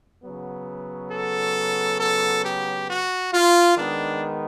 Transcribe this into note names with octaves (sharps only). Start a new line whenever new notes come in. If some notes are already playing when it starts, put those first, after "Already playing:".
C#3 F#3 B3
A4
A4
G4
F#4
F4
D#3 G#3 B3 D4